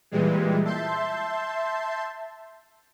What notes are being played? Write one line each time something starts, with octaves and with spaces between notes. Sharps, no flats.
A#2 E3 G3 G#3
E5 A5 C6 G6